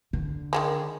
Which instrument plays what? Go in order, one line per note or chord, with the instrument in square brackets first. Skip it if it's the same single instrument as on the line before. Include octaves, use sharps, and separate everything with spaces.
[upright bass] D3
[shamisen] D#3 G3 G#3